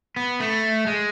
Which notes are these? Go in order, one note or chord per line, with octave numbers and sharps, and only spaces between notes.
B3
A3
G#3